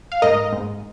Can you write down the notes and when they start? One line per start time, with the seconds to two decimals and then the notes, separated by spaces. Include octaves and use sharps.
0.12 F5
0.22 G#2 A#4 D#5
0.53 G#2